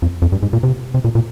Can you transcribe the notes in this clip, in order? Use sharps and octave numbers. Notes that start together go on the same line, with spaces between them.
F2
F2
G2
G#2
A#2
C3
C3
A#2
A#2